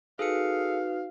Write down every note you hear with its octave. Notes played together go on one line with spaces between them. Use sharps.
D#4 F#4 G#4 A4 B4 F5 C#7